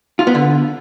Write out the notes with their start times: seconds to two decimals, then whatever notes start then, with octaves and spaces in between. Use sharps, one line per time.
0.19 F4
0.27 B3
0.35 D3